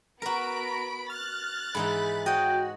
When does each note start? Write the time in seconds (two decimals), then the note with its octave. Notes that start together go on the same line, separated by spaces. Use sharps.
0.22 B3 F#4 A#4 A#5 B5 D7
1.10 F6 F#6 A6
1.75 G#2 E3 D#4 B5
2.26 F#4 C#5 D#5 G5